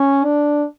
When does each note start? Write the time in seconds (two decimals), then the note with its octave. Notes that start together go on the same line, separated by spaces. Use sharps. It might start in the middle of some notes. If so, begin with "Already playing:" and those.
Already playing: C#4
0.24 D4